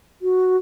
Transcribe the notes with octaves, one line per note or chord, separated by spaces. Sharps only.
F#4